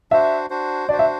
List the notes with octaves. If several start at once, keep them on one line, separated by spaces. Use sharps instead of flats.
D4 F#4 C5 E5
D4 F#4 C5
D4 F#4 C5 D5
E5